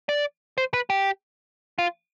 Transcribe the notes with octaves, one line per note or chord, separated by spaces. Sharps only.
D5
C5
B4
G4
F4